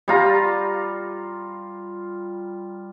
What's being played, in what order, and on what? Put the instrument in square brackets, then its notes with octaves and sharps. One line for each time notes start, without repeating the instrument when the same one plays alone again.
[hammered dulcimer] G3 F4 A#5